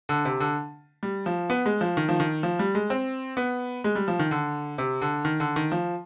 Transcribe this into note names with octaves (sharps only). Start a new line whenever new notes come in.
D3
C3
D3
G3
F3
B3
G#3
F3
D#3
F3
D#3
F3
G3
G#3
C4
B3
G#3
G3
F3
D#3
D3
C3
D3
D#3
D3
D#3
F3